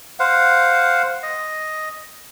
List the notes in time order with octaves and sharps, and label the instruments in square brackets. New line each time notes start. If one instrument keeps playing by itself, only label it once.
[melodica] C5 F5 F#5
D#5